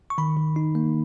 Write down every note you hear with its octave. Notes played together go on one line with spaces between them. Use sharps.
C#6
D#3 B5
D#3
D#4
A#3